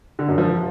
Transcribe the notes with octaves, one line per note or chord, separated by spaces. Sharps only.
D3
F#2
F3